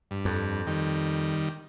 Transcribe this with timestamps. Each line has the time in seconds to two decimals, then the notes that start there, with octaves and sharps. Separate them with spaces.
0.11 G2
0.25 F2
0.67 D#3 G3